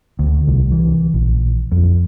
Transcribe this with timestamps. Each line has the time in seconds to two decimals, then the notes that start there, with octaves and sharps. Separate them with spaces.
0.19 D2
0.47 C2
0.72 E3
1.14 A#1
1.72 F2